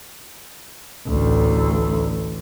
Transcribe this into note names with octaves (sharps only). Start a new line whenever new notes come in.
A1 D2